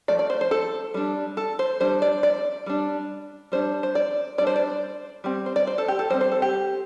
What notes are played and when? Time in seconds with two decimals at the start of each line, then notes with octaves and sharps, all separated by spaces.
0.08 F3 A3 D5
0.19 D5
0.30 C5
0.41 C5
0.51 A4
0.94 G3 D4
1.37 A4
1.59 C5
1.80 G3 D4 C5
2.02 D5
2.23 D5
2.66 G3 D4
3.52 G3 D4 C5
3.83 C5
3.95 D5
4.38 G3 D5
4.42 D4
4.47 C5
4.56 D5
5.24 G3 C4
5.46 C5
5.56 D5
5.67 C5
5.78 A4
5.88 G4
5.99 A4
6.10 G3 C5
6.14 C4
6.21 C5
6.32 A4
6.42 G4